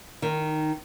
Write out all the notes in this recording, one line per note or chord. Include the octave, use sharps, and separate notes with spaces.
D#3